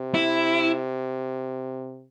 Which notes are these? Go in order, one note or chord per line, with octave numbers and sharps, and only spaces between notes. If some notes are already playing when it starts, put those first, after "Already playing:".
Already playing: C3
E4